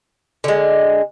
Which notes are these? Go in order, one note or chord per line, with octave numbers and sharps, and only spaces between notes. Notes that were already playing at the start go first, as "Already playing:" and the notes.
D3 G#3